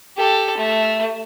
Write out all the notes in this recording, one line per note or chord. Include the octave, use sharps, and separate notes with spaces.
G4 A4
A3